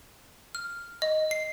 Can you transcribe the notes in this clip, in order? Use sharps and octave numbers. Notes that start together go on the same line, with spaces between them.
F6
D#5
C7